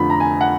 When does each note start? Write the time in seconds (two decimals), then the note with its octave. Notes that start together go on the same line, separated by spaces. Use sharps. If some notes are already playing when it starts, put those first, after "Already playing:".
Already playing: F1 F2 D3 F3 B5
0.10 A#5
0.20 G#5
0.41 F#5